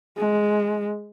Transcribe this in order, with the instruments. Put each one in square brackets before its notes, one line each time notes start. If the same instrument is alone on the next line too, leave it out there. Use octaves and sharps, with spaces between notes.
[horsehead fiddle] G#3